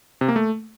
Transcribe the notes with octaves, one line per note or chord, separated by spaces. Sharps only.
C3
A#3
A3